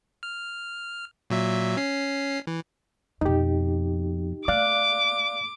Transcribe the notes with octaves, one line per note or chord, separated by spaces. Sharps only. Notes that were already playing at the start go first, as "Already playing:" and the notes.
F6
A#2 F#3 E5
C#4 C7
E3
F2 B2 D#4 G4
A3 D5 F5 D6 F#6